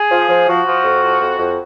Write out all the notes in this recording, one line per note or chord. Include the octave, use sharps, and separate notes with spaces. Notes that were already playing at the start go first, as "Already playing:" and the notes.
Already playing: G#4
F3
F3
F3 F#4
F3
F2
F3
F2
F2